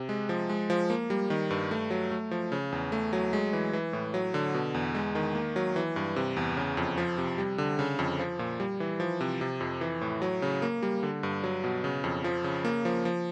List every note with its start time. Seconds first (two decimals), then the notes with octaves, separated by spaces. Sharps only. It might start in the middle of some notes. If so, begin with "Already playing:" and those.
Already playing: C3
0.09 G#3
0.29 F3
0.50 G#3
0.70 F3
0.90 A#3
1.10 G3
1.30 D#3
1.50 G2
1.71 A3
1.90 F#3
2.11 A3
2.31 F3
2.52 C#3
2.72 E2
2.92 A3
3.13 F#3
3.33 G#3
3.53 E3
3.73 E3
3.93 A2
4.14 F#3
4.34 D3
4.54 B2
4.74 E2
4.95 G#3
5.15 D#3
5.35 A#3
5.56 F#3
5.76 E3
5.96 G2
6.16 C3
6.37 E2
6.57 C#3
6.77 F2
6.98 F3
7.18 C3
7.38 G3
7.58 D3
7.79 C#3
7.99 F2
8.19 F3
8.39 A#2
8.60 G3
8.80 E3
9.00 F3
9.21 C3
9.41 C3
9.61 F2
9.81 E3
10.01 A2
10.22 F#3
10.42 C#3
10.62 A#3
10.83 G3
11.03 D3
11.23 G2
11.43 F#3
11.64 B2
11.84 C#3
12.04 F2
12.24 F3
12.44 C#3
12.65 A#3
12.85 F3
13.05 F3